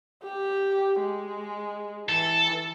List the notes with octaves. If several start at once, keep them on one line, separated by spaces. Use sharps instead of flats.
G4
G#3
E3 A4